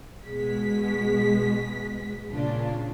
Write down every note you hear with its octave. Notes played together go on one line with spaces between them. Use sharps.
B2 G#3 B6
A#2 C#3 D4 F4